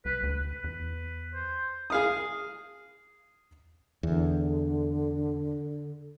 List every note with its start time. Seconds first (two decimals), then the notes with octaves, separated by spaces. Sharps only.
0.05 C2 B4
0.23 D2 B4
0.64 E2
1.34 C5
1.90 G#4 F5 D#6
4.03 E2 D3